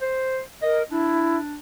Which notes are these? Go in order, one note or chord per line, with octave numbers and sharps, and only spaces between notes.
C5
A#4 D#5
D4 E4